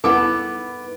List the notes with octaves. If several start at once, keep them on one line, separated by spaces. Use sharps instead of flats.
B3 E4 A4 D6